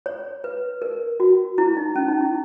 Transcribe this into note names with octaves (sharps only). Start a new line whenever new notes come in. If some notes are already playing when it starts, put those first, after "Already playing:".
C#5
B4
A#4
F#4
E4
D#4
C#4
D#4
E4